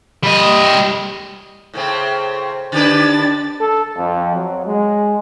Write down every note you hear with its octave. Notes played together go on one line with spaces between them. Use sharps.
G3 D#5
A2 C#3 C4
D3 D4 G4 B4 A6
A4
F2
F#3
G#3